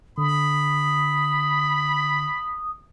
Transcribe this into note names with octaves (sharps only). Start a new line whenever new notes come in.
D3 B5 D#6